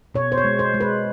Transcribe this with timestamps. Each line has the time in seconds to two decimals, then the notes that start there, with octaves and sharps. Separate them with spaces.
0.14 B2 C#5
0.32 C5
0.38 C#5
0.44 G#3
0.59 C5
0.74 G#3
0.81 B4